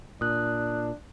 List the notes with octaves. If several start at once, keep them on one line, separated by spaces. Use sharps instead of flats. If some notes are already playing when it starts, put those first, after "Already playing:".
A#2 D4 D#6 F#6